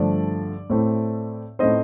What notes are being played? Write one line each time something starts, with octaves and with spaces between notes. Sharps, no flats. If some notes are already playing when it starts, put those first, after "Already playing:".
Already playing: G2 D3 F3 A3 D4 D5
A2 A3 C4
A2 A3 C4 D#4 C5 D#5